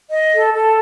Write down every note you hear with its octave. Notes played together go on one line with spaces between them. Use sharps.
D#5
A4
A4